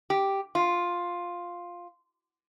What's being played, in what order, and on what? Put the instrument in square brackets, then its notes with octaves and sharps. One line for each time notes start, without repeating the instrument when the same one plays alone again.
[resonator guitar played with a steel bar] G4
F4